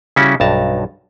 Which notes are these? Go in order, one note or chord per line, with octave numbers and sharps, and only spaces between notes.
C#3 G3 C#4 E4 F#4
B1 G2 A5 A#5